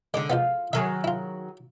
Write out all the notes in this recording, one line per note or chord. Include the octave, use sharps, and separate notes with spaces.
D3 G#3 D#4 D5
F3 G#3 B3 F4
D#3 F#3 G#4 A4 E5
E4 F4